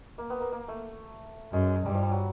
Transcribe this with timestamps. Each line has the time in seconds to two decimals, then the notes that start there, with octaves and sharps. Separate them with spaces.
0.18 A#3
0.30 B3
0.41 A#3
0.52 A#3
0.68 A3
1.52 F#2 G#3
1.86 G2 G3
1.94 F3
2.03 G3
2.12 F#3